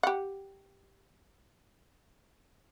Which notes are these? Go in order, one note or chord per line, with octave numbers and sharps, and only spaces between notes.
G4 F#5